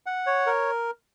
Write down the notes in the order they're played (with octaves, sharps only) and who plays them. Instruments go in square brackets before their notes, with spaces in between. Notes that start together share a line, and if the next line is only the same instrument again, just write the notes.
[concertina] F#5
C#5
A#4